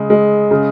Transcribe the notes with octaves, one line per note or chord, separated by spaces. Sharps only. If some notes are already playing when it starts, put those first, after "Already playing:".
Already playing: C#3 G#3
G#3
C#3